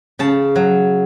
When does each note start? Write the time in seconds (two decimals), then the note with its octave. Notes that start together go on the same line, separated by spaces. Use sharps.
0.19 C#3 A5
0.56 F#3